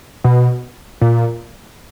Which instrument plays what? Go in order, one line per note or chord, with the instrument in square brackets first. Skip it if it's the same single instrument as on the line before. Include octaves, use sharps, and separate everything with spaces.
[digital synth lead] B2
A#2